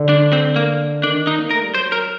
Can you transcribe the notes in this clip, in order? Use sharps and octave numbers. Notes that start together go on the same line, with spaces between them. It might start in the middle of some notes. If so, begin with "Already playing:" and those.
Already playing: D3
D4
C4
A#3
D#3 D4
D#4
A#3
A3 A#4
G3
F#3 C5
A#4